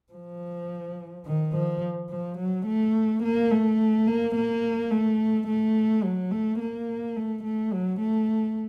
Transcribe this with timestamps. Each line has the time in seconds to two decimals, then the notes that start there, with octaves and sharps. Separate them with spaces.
0.13 F3
1.26 D#3
1.54 F3
2.10 F3
2.38 F#3
2.66 A3
3.23 A#3
3.51 A3
4.07 A#3
4.35 A#3
4.91 A3
5.48 A3
6.04 F#3
6.32 A3
6.59 A#3
7.16 A3
7.43 A3
7.73 F#3
8.00 A3